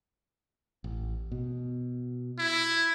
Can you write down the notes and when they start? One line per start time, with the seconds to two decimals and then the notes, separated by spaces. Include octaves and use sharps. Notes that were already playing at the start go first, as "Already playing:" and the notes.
0.84 A1
1.32 B2
2.39 E4